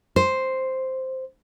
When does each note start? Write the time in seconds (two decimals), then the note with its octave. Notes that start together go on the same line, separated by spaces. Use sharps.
0.16 C5